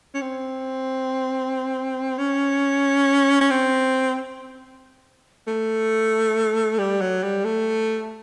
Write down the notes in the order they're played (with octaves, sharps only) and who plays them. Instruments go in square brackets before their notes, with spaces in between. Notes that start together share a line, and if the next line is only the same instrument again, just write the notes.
[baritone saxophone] C#4
C4
C#4
C#4
C4
A3
G3
F#3
G3
A3